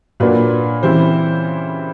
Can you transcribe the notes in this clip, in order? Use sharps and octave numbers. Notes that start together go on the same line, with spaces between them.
A#2 F#3 A#3 D4 B4
C#3 E3 G3 C4 E4 C5